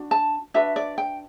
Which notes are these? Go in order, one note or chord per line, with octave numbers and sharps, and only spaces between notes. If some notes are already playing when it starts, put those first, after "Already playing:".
Already playing: D4 F#4
A5
D4 F#4 B4 E5
D5
G5